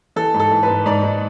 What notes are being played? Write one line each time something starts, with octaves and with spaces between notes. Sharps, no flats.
E3 A4
G#2
A4
E3
B4
G#2
G#2 D5
G#2